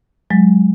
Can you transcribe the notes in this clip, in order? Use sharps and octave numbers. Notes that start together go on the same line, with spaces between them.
F#3 G#3